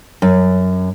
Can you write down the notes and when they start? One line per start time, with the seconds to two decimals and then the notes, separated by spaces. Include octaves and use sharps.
0.22 F#2